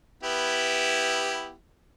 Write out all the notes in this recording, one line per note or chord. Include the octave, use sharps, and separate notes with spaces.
B3 E4 G4